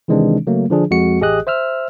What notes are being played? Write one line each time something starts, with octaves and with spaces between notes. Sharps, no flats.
C3 D#3 E3 G#3 C4 D4
C#3 F#3 A3 A#3
D3 F3 D4 G#4
F2 G#3 F#4 C#7
A1 G4 G#4 D#5 D#6 F#6
C5 E5 E6 F6